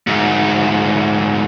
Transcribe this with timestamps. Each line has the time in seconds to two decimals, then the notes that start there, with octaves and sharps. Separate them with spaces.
0.07 D2 G#2